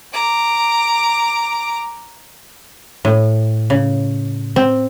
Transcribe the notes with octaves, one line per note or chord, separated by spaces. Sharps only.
A#5 D6
A2
C#3
C4